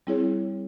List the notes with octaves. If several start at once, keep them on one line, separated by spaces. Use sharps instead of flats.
G3 C4 E4 G#4 C#5